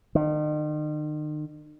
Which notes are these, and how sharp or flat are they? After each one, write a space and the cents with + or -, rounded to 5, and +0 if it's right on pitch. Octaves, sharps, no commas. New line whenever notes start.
D#3 -40